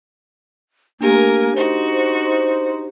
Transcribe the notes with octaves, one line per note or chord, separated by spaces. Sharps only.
A3 A#3 D4 G4 A#4 G#5
D#4 F#4 C5